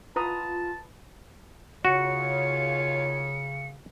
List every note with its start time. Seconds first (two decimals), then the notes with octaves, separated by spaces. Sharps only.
0.16 F4 B4 A5 A#5 D#6
1.85 D#2 C#3 F4 F#4 C#5 C#7